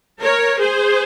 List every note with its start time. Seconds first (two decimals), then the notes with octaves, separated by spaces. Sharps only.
0.21 A#4 C#5
0.60 G#4 C5